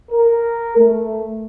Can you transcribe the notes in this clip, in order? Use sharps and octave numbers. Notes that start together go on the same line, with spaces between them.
A#4
A3